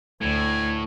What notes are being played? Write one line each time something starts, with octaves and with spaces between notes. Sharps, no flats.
D2 A2 G#5